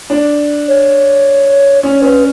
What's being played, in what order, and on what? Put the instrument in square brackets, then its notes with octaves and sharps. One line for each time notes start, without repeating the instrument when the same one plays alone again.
[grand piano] D4
[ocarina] C#5
[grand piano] C#4 [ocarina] C#5
[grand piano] C#4 [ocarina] B4